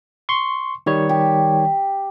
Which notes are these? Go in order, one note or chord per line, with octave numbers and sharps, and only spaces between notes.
C6 C#6
D#3 G3 C#5 E5
G4